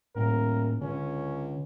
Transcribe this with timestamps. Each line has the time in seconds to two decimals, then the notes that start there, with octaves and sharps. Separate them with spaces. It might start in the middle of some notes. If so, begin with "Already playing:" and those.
0.15 D#1 A2 A#4
0.81 C#2 D3 C#4